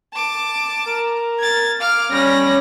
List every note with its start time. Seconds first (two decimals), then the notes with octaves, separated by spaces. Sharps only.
0.13 A5 D6
0.86 A#4
1.39 G#6 A6
1.80 F5 D6 F6
2.12 G3 C#4 B5 A#6